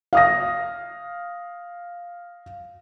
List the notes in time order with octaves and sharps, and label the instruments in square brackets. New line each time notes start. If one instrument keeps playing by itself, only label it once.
[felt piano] F5 D#6 A#6